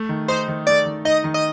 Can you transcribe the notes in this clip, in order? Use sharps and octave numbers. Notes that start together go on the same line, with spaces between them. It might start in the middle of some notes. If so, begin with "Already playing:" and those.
Already playing: A3
D#3
D#4 C5
D#3
A3 D5
D#3
D#4 D#5
D#3
D#5